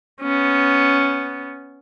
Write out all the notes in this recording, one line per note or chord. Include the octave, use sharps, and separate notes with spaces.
B3 C#4